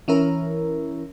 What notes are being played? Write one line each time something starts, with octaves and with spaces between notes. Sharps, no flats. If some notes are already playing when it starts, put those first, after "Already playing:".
E3 C#4 E4 A#4